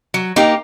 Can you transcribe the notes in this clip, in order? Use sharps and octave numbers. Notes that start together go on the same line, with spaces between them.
F#3
A#3 D#4 G4